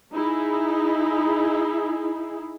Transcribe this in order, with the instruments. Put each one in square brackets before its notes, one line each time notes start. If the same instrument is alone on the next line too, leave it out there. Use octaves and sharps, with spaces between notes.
[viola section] D#4 E4 G#4